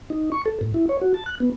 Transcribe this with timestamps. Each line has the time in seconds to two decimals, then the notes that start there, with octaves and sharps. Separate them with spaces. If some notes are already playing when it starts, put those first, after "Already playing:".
0.10 D#4
0.32 C#6
0.46 A4
0.61 A2
0.74 E4
0.89 C#5
1.01 F#4
1.14 A5
1.26 F#6
1.40 B3